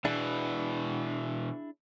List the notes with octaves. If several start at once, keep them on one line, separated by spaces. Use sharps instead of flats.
B2 E3 D4 E4 G#4